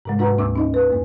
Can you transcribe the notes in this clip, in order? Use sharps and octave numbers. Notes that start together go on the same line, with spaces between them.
G#2 C3 G#3
G#2 D4 F#4 B4 F#5 A#5
D2 A#3 D4 D6 E6
C#4 D#4 D#5
B4
F#2 A#3